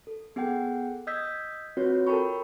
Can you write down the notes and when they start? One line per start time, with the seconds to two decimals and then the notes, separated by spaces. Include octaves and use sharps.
0.07 A4
0.36 B3 G#4 A4 F#5 G5
1.07 D#5 D#6 E6 G6 G#6 B6
1.77 C4 F4 F#4 B4 C#5
2.07 A4 A#4 G5 A5 B5 C#6